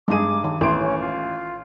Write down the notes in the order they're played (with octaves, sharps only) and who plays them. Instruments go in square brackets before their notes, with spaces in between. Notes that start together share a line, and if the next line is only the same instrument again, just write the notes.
[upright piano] G2 D#7 [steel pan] G#3 D#4 G#4 [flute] D6
[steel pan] D#3
[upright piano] A1 D7 [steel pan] E4 [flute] C6
[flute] C#4
F4